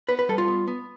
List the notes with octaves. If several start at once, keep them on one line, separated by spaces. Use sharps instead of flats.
B3 B4
B4
G3 A4
F4
B3
B3